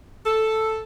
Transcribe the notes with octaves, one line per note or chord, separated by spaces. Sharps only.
A4